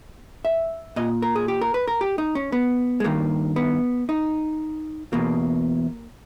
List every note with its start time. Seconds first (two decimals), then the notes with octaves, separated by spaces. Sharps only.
0.45 E5
0.96 A#2 D#5
1.22 A#4
1.36 G#4
1.48 G4
1.61 A#4
1.74 B4
1.88 A#4
2.01 G4
2.18 D#4
2.35 C#4
2.52 B3
3.00 G#3
3.04 G2 D#3 A#3
3.56 B3
4.09 D#4
5.13 E2 B2 A#3